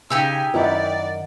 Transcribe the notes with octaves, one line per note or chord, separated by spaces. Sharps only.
C#3 D#4 G4 G#5 E6
F#2 D#3 E4 B4 D5 F#5